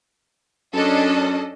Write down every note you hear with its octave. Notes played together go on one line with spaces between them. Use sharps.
F#2 C#4 D4 A4 D#5